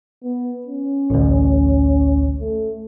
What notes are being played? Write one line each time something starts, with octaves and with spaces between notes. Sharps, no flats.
B3
C#4
A1 D2
A3